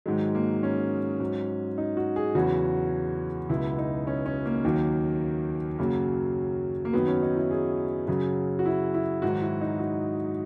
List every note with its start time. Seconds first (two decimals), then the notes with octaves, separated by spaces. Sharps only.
0.06 G#2 D#3 F#3 G#3
0.35 A#3
0.63 C#4
1.20 G#2 F#3
1.78 D#4
1.97 F#4
2.16 G#4
2.35 E2 C#3 F#3 F#4
3.49 C#2 B2 F#3 E4
3.78 D#4
4.07 C#4
4.26 C#4
4.46 A#3
4.64 D#2 D#3 F#3
5.79 F#2 C#3 F#3 A#3
6.85 A#3
6.93 F#2 D#3 F#3 B3
7.08 C#4
7.22 D#4
7.36 E4
7.51 G#4
8.08 F#2 C#3 F#3 G#4
8.59 F#4
8.66 E4
8.94 E4
9.22 G#2 D#3 F#3 F#4
9.41 E4
9.61 D#4
9.79 F#4